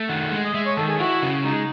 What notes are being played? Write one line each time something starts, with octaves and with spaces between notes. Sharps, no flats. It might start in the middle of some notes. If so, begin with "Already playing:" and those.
Already playing: A3
D#3 F#5
G#3
D#5
G#3 E5
C#5
D#3 A4
G#4
E4 F#4
C#3
G#3 D#4